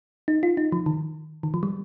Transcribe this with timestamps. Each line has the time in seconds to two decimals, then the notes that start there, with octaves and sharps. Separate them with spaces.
0.28 D#4
0.43 F4
0.57 D#4
0.72 F3
0.86 D#3
1.43 D#3
1.54 F3
1.63 G3